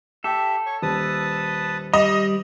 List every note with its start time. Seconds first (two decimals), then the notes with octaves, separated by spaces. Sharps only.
0.24 G4 A4 E5 G5
0.66 C#5 C#6
0.82 D#1 B4 A5 D#6
1.93 G3 D#5